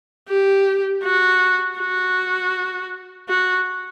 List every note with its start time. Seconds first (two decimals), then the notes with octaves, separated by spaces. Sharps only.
0.29 G4
1.04 F#4
1.80 F#4
3.29 F#4